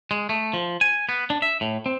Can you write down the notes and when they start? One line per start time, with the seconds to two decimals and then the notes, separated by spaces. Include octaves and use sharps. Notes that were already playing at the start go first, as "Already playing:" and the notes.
0.11 G#3
0.29 A3
0.53 F3
0.81 G#5
1.09 B3
1.30 D4
1.42 E5
1.61 A2
1.86 C4